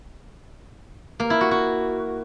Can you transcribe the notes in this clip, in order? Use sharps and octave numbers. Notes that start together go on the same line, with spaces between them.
A#3
E4
F#4
F#4